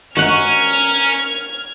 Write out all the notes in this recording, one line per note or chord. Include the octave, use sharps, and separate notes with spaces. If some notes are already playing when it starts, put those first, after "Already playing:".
C#4 F#4 A#4 F#5 F6 G#6